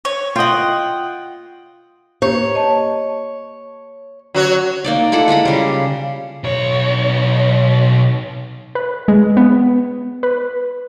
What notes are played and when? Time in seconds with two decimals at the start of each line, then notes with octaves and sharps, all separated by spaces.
0.05 C#5
0.36 F4 D#5 F#5 G5
2.22 A#3 G4 C5 C#5
2.55 D#5 A5
4.35 F#3 F#4 C#5
4.84 A#3 D#4 D5
5.12 E4 F4 A4 F#5
5.28 G#3 F4 A#5 B5
5.45 C#3 G3
6.44 B1 C#5
8.75 B4
9.08 G#3
9.37 B3
10.23 B4